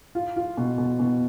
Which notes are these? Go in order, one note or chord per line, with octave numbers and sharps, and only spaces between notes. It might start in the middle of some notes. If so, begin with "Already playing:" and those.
F4
F4
B2
B2
B2